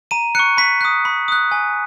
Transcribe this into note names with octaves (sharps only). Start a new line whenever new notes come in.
A#5 D#7
C#6 F#6 C#7
B5 B6
D#6 F#6
B5
D#6 F#6
G#5